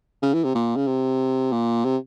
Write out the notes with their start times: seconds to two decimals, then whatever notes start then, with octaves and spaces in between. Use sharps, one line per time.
0.22 C#3
0.33 E3
0.44 C3
0.55 A#2
0.76 C#3
0.87 C3
1.52 A#2
1.84 C3